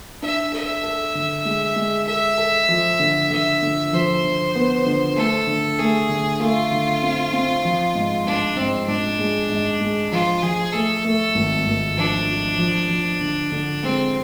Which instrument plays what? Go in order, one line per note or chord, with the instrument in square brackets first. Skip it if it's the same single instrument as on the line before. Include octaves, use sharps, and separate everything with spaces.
[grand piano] D4 [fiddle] E5
[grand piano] A4 [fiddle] E5
[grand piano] A4
D3
G#3
G#3
[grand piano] A4 [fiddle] E5
[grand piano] A4
F3
D3
[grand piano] D3 [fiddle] E5
[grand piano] D3
[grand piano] F3 [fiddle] C5
[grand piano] D3
B3
D3
[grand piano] A3 [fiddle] A4
[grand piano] D3
[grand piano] A3 [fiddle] G#4
[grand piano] D3
[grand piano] A3 [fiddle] F4
[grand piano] D3
C4
C4
F3
G#2
[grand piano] G#2 [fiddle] D4
[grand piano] G#2 [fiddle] C4
[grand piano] G#2 [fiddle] D4
[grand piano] G#3
G#2
G#3
[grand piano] F3 [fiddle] F4
[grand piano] F3 [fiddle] G#4
[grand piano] A3 [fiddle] A4
[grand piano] A3
G#1
G#1
[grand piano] F3 [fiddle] D4
[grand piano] F3
F3
F3
D3
D3
[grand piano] G#3 [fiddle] C4